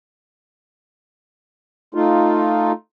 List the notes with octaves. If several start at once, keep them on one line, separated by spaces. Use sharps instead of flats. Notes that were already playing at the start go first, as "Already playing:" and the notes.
A3 D#4 F4